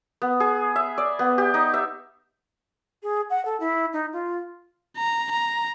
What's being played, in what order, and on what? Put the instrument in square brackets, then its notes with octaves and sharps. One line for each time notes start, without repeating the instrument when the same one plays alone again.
[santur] B3
G#4
E5
D5
B3
G4
D#4
E5
[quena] G#4
F#5
A4
E4
D#4
F4
[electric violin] A#5
A#5